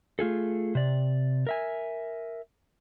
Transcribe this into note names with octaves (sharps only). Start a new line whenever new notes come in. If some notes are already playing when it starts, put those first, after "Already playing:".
A3 F4 G#4 A4
C3 D5
A#4 E5 G#5